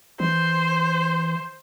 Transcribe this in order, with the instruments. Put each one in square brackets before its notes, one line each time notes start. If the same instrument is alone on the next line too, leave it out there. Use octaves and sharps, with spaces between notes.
[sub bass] E3 [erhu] C5